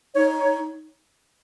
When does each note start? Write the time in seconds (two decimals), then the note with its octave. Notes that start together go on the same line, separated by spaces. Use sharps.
0.16 D#4 C#5
0.39 C#5